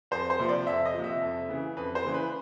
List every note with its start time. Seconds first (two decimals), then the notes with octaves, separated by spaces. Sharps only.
0.11 F2 C5
0.30 C5
0.39 C3 F3
0.49 D5
0.67 F2 E5
0.85 D#5
0.94 C3 F3
1.04 E5
1.22 F2
1.49 C#3 E3
1.77 F2 B4
1.95 C5
2.05 C#3 E3
2.14 B4